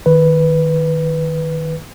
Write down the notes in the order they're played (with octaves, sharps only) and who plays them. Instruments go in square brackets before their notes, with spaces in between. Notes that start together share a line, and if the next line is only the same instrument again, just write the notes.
[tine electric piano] D#3 B4